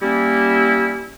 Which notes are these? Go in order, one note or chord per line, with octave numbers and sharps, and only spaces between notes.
G3 A#3 C#4 E4